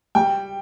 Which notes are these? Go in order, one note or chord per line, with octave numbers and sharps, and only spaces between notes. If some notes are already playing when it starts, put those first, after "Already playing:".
G3 G5